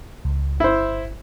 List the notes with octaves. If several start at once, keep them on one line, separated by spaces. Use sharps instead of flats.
C#2
G1 E4 C5